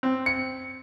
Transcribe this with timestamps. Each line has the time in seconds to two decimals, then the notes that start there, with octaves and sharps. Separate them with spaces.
0.03 C4
0.26 C#7